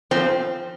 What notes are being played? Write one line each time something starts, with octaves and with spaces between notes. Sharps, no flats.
F3 C4